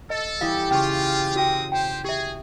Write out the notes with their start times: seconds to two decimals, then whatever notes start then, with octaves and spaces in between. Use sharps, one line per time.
0.10 A4 D#5
0.41 E3 G3 G4 E5 F5 D#6
0.71 C#3 F4 G5 C#6
1.36 C4 F#4 A#4 G5 D#6
1.72 G4 C5 G5
2.05 G4 G#4 E5